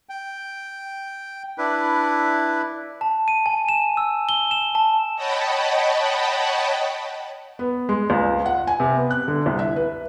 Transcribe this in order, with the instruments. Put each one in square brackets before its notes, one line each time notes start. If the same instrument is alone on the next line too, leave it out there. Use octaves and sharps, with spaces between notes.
[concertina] G5
D4 E4 B4
[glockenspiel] A5
D#7
G#5
E7
E6
G7
E7
A5
[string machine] C#5 D#5 F#5 G5 A5 B5
[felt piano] B3
G#3
C#2
F#5
G#5
C3
B3
F#6
D3
C2
E5
B4